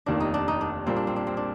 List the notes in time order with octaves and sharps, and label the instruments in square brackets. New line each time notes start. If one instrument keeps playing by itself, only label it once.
[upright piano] F1 D#2 D#3 A#3 [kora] D4
[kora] D#4
D4
D#4
D4
[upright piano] A#1 A#2 G3 A#3 [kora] C4
[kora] D4
C4
D4
C4
D4